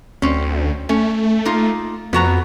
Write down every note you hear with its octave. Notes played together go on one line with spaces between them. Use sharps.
D2 C4 C#4
A3 C#4
A#3 D#4 F4
F2 B3 F#4 A#5